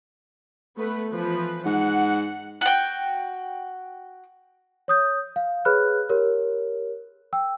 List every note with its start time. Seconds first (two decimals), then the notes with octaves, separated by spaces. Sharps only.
0.78 A3 B3 B4
1.11 E3 F3 B4
1.65 G#2 F#5
2.61 F#4 G5
4.88 C#5 D#6 G6
5.36 F5
5.65 G#4 B4 C#5 B5 F6 F#6
6.09 G4 A#4 C#5
7.33 G5 E6